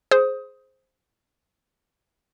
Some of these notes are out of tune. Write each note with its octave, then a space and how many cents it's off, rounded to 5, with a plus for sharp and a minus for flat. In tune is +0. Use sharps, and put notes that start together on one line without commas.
G#4 +15 C5 +0 D#6 +15